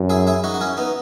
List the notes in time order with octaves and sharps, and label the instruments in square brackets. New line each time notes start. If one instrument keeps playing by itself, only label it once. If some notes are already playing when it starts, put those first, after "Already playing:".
Already playing: [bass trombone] F#2
[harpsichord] E4 G#4
E4 G#4
D#4 F#4
F#4
C#4 E4
B3 D#4